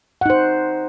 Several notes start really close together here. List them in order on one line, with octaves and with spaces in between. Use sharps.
F#5 D#4 C5